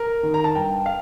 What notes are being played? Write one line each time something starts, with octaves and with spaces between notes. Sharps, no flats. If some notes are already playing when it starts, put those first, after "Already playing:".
Already playing: A#4
D#3
A#5
A5
G2 G5
F5